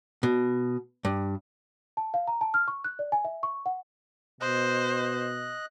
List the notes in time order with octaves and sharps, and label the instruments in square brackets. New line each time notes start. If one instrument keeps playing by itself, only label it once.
[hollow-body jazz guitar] B2
G2
[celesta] A5
F5
A#5
A5
F6
C#6
F#6
D5
G#5
E5
C#6
F#5
[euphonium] B2 [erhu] C5 [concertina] D#5 F#6